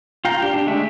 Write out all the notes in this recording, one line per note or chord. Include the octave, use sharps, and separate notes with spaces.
F4 F5 G5 A#5
D4 G4
D4 G4
D3 G#3 A3 D4 E5